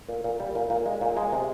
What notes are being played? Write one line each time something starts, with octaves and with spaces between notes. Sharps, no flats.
A#2
A#2
G3
A#2
A#2
G#3
A#2
G#3
C3